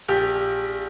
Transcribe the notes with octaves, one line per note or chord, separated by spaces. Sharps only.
A#1 G4